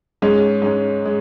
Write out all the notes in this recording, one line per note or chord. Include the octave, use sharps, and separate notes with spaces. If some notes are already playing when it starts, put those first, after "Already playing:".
G#2 G#3 C#4
G#2 G#3 C#4
G#3